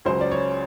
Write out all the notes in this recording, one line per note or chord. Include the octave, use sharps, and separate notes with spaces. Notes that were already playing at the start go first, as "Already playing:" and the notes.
C#2 C#3 F#3 C5
D5
C#5